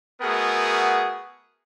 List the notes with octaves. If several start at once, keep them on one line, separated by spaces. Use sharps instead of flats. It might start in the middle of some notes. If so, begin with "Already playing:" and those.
A3 B3 F#4 G#4 A#4 F#5